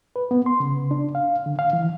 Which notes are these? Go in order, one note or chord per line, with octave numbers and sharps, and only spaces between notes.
B4
B3
C6
C#3
D4
F5
D3
F5
E3